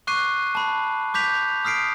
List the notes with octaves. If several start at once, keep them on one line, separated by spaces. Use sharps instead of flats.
C#6 D6 F#6 C7 D#7
A5 B5
D6 G6 B6 F7
D#6 F6 B6 C7 D7